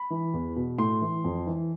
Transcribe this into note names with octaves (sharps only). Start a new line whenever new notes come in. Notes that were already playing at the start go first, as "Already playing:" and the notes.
Already playing: B5
E3
E2
B2
A2 C6
E3
F2
E3